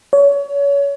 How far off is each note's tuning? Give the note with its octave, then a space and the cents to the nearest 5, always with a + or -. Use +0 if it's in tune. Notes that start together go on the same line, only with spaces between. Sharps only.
C#5 +30